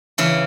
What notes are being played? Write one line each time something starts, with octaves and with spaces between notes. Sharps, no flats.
C#3 E3